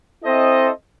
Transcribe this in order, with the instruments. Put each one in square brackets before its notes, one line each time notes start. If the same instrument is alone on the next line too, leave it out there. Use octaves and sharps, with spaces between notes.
[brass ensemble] C4 E4 A4 C5 D#5